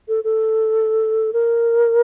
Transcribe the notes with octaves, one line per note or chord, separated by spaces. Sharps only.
A4
A4
A#4